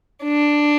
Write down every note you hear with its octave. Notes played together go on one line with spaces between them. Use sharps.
D4